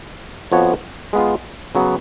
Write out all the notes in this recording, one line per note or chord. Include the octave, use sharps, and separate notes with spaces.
F2 F3 B3 F#4 C#5
G#3 B3 F4
C#3 F#3 B3